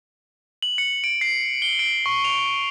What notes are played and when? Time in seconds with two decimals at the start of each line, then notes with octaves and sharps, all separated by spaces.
0.63 F#7
0.78 C#7
1.04 D7
1.21 C7
1.62 G7
1.79 D7
2.06 C#6
2.25 F7